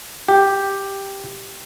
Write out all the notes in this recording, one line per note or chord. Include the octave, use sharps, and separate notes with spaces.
G4